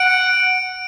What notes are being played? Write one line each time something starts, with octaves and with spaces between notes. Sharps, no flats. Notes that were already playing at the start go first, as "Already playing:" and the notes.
Already playing: F#5 D7